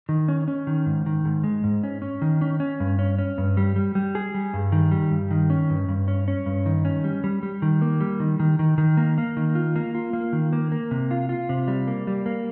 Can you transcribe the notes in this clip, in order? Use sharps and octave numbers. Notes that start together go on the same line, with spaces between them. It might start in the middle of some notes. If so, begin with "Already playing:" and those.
D#3
C#4
C#4
D#3
G#2
D#3
G#2
G#3
G#2
C#4
C#4
D#3
C#4
C#4
G2
C#4
C#4
G2
G3
G3
G3
G#4
G3
G2
D#3
G3
G2
D#3
C#4
G2
G2
C#4
C#4
G2
D#3
C#4
G3
G3
G3
D#3
A#3
G3
D#3
D#3
D#3
D#3
A#3
A#3
D#3
F4
A#3
F4
A#3
D#3
A#3
A#3
C3
F4
F4
C3
G3
A#3
G3
A#3